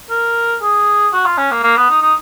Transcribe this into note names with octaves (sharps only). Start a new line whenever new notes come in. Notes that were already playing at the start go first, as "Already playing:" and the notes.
A#4
G#4
F#4
F4
C#4
A#3
A#3
B3
D#4
D#4